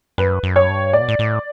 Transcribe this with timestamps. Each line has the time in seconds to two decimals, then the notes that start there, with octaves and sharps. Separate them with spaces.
0.18 F#2 B4
0.43 F#2
0.56 C#5
0.69 G2
0.93 A2 D5
1.01 B2
1.08 A2
1.19 A2